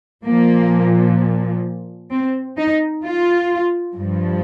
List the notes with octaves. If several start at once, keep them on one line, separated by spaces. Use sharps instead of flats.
A#2 F3 A#3
C4
D#4
F4
G2 F3